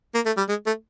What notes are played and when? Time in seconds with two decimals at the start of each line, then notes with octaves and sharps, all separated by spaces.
0.15 A#3
0.26 A3
0.37 G3
0.49 G#3
0.66 A3